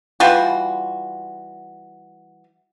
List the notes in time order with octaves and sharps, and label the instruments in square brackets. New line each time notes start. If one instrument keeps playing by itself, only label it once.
[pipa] E3 G3 F4 F#4